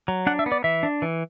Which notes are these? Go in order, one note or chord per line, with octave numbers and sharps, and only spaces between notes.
F#3
D4 F#5
E5
B3
D5
E3 E5
D4
E3